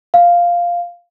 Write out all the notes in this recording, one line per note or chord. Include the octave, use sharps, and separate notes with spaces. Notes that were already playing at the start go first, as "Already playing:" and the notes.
F5